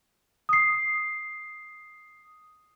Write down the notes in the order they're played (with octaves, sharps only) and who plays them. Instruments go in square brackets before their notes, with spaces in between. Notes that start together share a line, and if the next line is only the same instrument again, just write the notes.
[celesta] D#6 C7